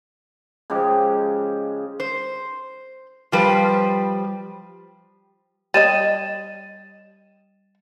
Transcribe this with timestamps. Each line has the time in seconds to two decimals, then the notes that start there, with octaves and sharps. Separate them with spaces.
0.70 C#3 F3 G#3 G4
2.00 C5
3.32 F3 G3 B4 C5
5.74 G3 C#5 D#5 A6 D#7 E7